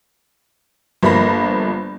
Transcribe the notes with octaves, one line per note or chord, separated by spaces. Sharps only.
G1 F3 A#3 B5 A#6